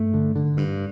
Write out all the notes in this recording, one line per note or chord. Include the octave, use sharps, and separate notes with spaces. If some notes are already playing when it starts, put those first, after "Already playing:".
Already playing: G2 A3
D3
D3
G2